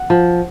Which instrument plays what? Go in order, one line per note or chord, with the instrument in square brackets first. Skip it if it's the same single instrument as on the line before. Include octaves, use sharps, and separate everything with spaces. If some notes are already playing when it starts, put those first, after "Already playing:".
Already playing: [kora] F#5
F3